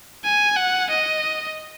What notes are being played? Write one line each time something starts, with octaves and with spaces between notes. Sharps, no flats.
G#5
F#5
D#5